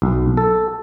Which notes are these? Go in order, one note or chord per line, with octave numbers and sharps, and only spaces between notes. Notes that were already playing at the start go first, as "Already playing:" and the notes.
B1
A4